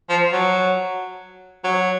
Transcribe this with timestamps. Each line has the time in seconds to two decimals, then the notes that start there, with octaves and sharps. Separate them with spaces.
0.09 F3
0.33 F#3
1.64 F#3